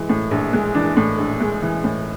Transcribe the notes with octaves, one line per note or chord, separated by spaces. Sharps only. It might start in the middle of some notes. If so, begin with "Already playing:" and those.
Already playing: E3 G#3
A2
A#1
G#3
E3 D4
A2
A#1
G#3
E3
A2